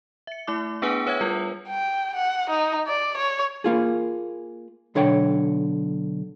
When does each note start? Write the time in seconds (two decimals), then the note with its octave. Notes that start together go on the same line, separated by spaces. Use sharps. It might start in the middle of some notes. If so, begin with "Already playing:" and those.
0.27 E5 C#7
0.47 A3 E4 D6
0.82 B3 D4 G#4 B4 F#5 G#5
1.07 B4 C#5 E5 F#5 G#6
1.21 G3 F4 A#4 B4
1.68 G5
2.16 F#5
2.50 D#4
2.88 D5
3.18 C#5
3.64 A#3 F4 G#4
4.95 B1 D3 C#5 G5